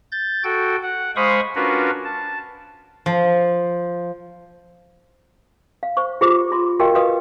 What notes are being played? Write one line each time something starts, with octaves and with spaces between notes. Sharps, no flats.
G6 A6
F#4 A4 G5
F#5
G#3 C5 F5 B5 C#6 D#6
C#4 D4 F4 F#4 A#4 B4
A5
F3
F5
C5 C#6
F4 G4 G#4 C5 D6
F4 C6
F#4 G4 A#4 D#5 F5 G5
F#4 B4 D#5 F5 D#6